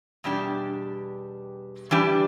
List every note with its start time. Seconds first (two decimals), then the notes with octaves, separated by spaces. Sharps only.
0.24 E2 B2 G3 D4 G4
1.91 E3 G3 D4 G4